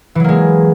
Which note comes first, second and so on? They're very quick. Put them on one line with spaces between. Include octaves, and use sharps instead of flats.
E3 F#3 A#3 G#3